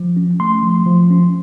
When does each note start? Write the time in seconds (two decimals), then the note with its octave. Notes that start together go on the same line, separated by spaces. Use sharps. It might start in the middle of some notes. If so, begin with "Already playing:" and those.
Already playing: F3
0.17 C#4
0.40 A3 C6
0.63 F3
0.86 F3
1.10 C#4